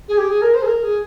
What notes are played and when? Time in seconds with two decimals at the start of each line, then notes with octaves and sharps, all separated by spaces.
0.08 G#4
0.18 G4
0.29 G#4
0.42 A#4
0.54 C5
0.62 G#4
0.66 A#4
0.83 G#4